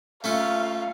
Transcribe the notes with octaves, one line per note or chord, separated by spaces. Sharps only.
A3 C#4 F4 F5